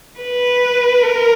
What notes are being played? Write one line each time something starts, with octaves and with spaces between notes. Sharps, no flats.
B4
A#4